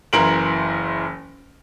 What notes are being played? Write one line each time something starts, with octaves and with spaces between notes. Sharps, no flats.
F#1 E3 A#4 C6 D7 F#7